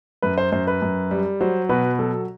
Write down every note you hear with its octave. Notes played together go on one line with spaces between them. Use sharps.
F#2 B4
C5
F#2 C5
B4
F#2
G3
F#3 C5
B2 B4
F#3 A4